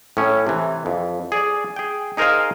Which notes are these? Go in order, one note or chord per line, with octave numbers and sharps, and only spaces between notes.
A2 C#4
C3 E3
F2
G#4 D5
G#4 G5
D#4 G#4 A#4 C5 D#5 F5